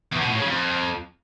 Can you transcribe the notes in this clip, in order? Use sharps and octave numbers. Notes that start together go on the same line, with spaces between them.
E2
B2
A2
C#3
F2